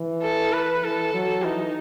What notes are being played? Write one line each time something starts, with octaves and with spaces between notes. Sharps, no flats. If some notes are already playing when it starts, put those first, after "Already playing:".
Already playing: E3
A4
B4
E3 A4
F#3
E3 D#4